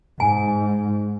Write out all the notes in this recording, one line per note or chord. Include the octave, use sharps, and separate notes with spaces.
G#2 G#5